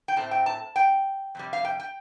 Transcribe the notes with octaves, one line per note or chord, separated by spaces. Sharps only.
G5
A2 A3 C4 A5
G5
A5
G5
F2 C3 G3
F5
G5
G5